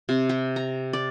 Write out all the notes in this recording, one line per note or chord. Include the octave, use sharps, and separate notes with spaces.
C3
G4
A#5
D5